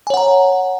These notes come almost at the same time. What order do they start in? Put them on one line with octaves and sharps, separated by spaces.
G#5 C#5 F#5 A#5